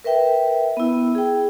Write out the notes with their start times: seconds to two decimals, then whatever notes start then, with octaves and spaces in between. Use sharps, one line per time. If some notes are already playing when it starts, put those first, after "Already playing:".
0.04 A#4 B4 E5 G5
0.77 B3 E4
1.15 G#4 G5